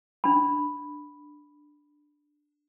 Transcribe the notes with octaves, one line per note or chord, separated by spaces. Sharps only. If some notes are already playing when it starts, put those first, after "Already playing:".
D4 B5